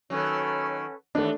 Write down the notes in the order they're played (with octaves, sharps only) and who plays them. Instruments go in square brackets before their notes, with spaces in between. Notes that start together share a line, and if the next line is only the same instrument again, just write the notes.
[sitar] D#3 F#3 [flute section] C#4 A4 B4
[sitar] D#2 E3 B3 [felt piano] A3 D4